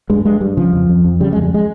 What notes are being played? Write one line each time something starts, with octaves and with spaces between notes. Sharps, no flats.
G2 G#3
G2 G#3
G2 G3
C#3 F3
F2
F2
F2
C#3 G3
F2 G#3
G3
G#3